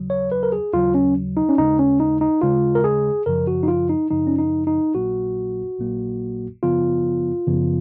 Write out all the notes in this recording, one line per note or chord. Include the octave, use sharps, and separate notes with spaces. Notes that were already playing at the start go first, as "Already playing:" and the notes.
Already playing: D#2 C#3 F#3
C#5
B4
A#4
G#4
D#2 C#3 F#3 F4
C#4
D#4
C#4
D#2 C#3 G#3 D#4
C#4
D#4
D#4
D#2 C#3 G#3 F4
A#4
G#4
F#2 C#3 F3 A#4
F#4
D#4
F4
D#4
F#2 C#3 F3 D#4
C#4
D#4
D#4
A#1 A#2 F#3 A#3 F#4
A#1 A#2 F#3 A#3
F#2 C#3 F3 B3 F4
F#2 C#3 F3 B3